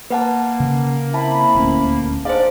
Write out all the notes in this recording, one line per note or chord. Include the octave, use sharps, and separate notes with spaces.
A#3 B4 F#5 A5
C#3
C4 E4 A5 B5
D#1 D2 C#4
G#2 D4 C5 D5 F5